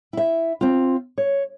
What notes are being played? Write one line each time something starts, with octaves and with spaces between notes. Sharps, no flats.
E4 E5
C4 F4
C#5